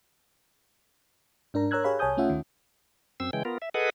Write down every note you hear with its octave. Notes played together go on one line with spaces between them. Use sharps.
G#2 D4 A#4 A#5
A#4 C#5 A#5 E6 F#6 G#6
G4 G#4 C#5 F5 B5
C2 C#5 G#5 A5 D#6 G6
A3 C#4 F4 E5 F#5
D#2 D#3
F#2 C4 E6
C#3 E3 G#3 G5
B3 F4 A#4
E5
G#4 A4 B4 D#5 F#5